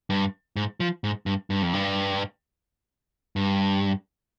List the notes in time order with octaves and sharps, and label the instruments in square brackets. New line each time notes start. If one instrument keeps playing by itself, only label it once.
[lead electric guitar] G2
G#2
F3
G#2
G2
G2
F2
G2
G2